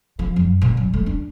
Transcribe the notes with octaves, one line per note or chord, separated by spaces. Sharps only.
F3
F#2
A#2
F#3
A3
D4